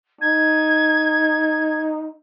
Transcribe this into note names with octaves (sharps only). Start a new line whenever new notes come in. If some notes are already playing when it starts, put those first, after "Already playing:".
D#4 G#6